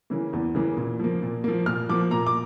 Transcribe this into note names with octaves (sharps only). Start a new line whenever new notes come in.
C#3 E3 A#3
E2
C#3 E3 A#3
A#2
F3 A#3
A#2
F3 A#3
A#2 F6
F3 A#3 D6
A#2 A#5
D6